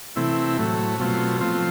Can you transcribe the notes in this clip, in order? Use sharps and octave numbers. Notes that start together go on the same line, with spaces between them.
C3 E3 A3 C4 E4
A2 F#3 A3
B2 F#3 A3 C4 F4
F3 A3 C4 F4